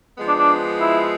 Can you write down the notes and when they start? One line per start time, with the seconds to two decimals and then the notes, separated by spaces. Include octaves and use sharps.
0.17 F3 G#3 B3
0.28 D4
0.39 D4
0.80 E4